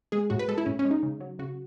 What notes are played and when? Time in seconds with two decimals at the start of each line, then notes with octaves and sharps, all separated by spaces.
0.12 G#3 G#4
0.30 A2 F#4
0.39 B4
0.48 G#3 A4
0.58 E4
0.66 A2 C#4
0.79 C#4
0.85 G#3
0.91 D#4
1.03 C#3
1.21 F#3
1.39 C#3 F#4